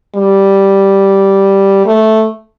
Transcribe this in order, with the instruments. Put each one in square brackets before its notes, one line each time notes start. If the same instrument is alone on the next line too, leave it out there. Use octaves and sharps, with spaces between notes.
[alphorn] G3
A3